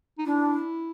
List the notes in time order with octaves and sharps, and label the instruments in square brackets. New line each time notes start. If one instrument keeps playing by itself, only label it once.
[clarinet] D#4
[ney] D4 [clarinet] E4